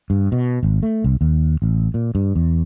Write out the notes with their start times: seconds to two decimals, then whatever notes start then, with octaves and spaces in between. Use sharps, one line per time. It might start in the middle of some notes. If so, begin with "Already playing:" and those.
0.10 G2
0.32 B2
0.63 G#1
0.83 A3
1.04 C2
1.21 D#2
1.62 A1
1.94 A#2
2.15 G2
2.35 E2